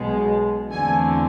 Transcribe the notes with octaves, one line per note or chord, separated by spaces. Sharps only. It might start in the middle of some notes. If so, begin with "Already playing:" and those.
Already playing: B1 B2 G#3
E2 D3 A3 C4 G#5